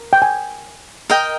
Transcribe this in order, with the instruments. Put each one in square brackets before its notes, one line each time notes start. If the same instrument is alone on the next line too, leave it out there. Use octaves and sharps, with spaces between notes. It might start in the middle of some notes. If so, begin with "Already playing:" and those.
Already playing: [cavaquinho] A#4
[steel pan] G5
G#5
[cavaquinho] A#4 D#5 G5